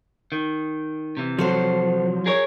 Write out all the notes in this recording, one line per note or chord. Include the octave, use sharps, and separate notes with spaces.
D#3
C3 E3
F3 F#3 F#4 A4 C5
G#4 A#4 C#5